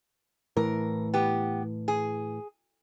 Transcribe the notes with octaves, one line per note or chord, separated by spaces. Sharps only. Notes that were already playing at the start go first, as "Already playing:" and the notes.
A2 E3 A#4
B3 G4
G#4